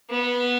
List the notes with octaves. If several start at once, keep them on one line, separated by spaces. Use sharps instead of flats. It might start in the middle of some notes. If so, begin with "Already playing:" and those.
B3